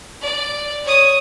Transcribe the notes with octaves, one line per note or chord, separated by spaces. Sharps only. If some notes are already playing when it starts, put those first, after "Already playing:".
D5
C#5 D#6